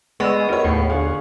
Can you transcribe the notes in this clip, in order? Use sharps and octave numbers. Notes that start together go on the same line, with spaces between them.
G#3 B3 G#4 D5 C#6 E6
G#4
D#4 G4 A#4 C#5
D#2 A2
D3 G#4 F5 C#6